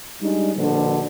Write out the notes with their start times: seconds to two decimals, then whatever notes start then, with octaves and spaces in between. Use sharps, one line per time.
0.21 G3 G#3 D4 D#4
0.55 A#1 B2 D3